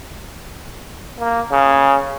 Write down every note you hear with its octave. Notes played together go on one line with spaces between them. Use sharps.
A#3
C#3